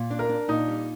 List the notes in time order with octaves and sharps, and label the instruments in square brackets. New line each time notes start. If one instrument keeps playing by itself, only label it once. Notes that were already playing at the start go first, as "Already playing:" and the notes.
Already playing: [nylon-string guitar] A#2
D4
[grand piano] A#4
[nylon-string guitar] D4
[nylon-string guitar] A#2 [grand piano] D#4
[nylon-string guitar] G3